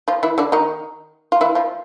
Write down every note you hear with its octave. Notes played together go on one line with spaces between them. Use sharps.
F3 F4
E3 E4
D3 D4
D#3 D#4
F4
E3 E4
F3 F4